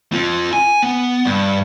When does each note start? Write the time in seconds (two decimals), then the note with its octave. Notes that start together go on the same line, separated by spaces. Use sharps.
0.12 C4 F4
0.53 G#5
0.83 B3
1.26 G2